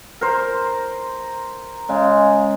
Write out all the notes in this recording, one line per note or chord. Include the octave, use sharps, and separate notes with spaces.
A#4 C5
C#3 G#3